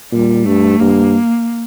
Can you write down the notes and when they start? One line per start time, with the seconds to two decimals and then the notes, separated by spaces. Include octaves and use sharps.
0.12 A#2 G3
0.46 G2 A3
0.80 G2 A#3